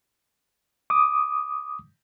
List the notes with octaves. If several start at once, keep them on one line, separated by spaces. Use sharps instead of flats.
D6 D#6